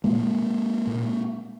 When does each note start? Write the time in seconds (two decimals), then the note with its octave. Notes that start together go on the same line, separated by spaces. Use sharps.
0.04 A#2 G#3 A#3
0.87 A#2